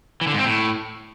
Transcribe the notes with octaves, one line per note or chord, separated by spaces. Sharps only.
E3
D3
G#2
C4
A2